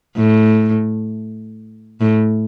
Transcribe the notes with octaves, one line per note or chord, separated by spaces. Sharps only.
A2
A2